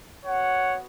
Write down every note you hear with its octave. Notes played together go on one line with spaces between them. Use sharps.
B3 F#4 C#5 F#5